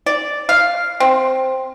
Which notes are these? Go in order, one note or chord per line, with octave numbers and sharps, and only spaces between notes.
D5
F5
C4